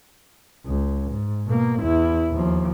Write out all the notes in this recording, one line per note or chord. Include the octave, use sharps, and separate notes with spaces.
C#2
G#2
B2 A#3
E2 E4
D#2 F3